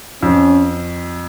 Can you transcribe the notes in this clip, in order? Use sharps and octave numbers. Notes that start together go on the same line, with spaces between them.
F2 C#4